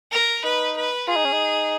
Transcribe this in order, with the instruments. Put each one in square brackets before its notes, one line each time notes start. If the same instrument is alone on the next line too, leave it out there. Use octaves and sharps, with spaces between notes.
[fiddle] A#4
[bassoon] D#4 [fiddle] B4
[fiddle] B4
[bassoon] F4 [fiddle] G#4
[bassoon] D#4
C#4
D#4